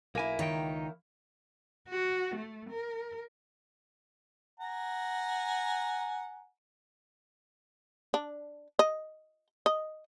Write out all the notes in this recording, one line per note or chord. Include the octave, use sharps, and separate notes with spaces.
B1 A#3 E4 G#5
C#2 D#3 D#4 C#5 G5
F#4
A3
A#4
F#5 G#5 A#5
D4
D#5
D#5